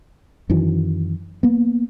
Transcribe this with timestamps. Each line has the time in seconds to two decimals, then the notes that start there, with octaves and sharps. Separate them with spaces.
0.50 F#2 D#3 E3 F#3
1.43 A#3 B3